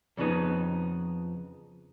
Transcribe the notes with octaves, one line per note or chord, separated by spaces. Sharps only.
F2 C#3 F3 B3 D#4